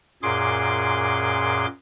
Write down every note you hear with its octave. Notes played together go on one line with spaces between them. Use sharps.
F#2 A#2 G#4 C6 D6